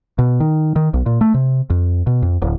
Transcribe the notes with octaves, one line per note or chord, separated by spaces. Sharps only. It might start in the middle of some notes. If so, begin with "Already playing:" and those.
B2
D#3
D#3
B1
A#2
A3
C3
F2
B2
F2
D1